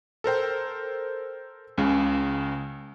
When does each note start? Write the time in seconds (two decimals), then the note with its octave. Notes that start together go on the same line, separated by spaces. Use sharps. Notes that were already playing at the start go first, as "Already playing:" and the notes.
0.24 A4 A#4 C5 G5
1.78 C#2 C#3